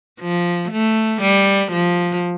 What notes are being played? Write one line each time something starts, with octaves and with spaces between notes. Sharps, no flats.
F3
A3
G3
F3